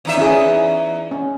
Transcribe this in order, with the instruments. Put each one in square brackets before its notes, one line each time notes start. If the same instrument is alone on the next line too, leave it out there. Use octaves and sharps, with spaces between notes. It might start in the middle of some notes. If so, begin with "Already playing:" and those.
[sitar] E2 D#4 E5
[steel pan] C#4 E4 G#4
C#4